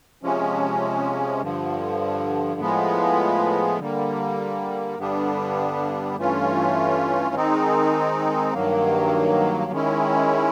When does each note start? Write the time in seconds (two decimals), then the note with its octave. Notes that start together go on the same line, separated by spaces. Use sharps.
0.23 C3 F3 G#3 C#4
1.42 G2 D3 F3
2.61 A2 F3 G#3 B3
3.79 D3 G3 A#3
4.98 G2 D3 G3 B3 D4
6.17 G2 E3 A3 C#4 F4
7.35 D#3 G#3 C4 D#4
8.53 G2 D#3 F#3 A#3
9.72 D#3 G#3 C#4 E4